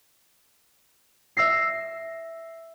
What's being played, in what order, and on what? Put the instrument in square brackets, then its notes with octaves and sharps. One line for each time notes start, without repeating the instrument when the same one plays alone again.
[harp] E5 E6 A#6 C7